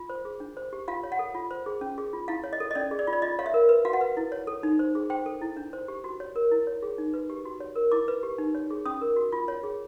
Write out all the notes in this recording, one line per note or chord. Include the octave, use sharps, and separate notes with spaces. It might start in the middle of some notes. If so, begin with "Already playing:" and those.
Already playing: F4
C5
G#4
D4
C5
G4
F4 F5
C#5
F#5
A4
F4
C5
G#4
C#4
G#4
F4
E4 F5
C#5
D#5
A4
D#5
C#4 D5
G#4
D5
F4
D5
F4 D#5
C#5 F5
E5
A#4
B4
F#4 F5
F#5
B4
E4
C#5
A4
D#4
C5
G#4
C5 G5
A4
E4
D4
C5
G4
F#4
C#5
A#4
E4
C#5
G#4
D#4
B4
G4
F#4
C#5
A#4
E4 D6
B4
G4
D#4
C#5
G#4
C#4 D#6
A#4
F#4
F4
C#5
G#4